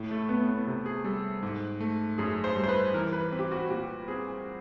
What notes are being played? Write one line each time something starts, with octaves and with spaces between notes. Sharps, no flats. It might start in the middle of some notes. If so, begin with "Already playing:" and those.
Already playing: A2
A3
A3 B3
B3
C3
G#4
G3 A4
G#2
A3
F#2 G#4
C5
G3
C5
B4
E3 A#4
B4
C4
G4
F#4
A#2 G4
C4 G#4